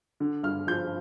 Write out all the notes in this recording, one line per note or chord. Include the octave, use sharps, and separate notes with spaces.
D3
G2 F6
F3 G6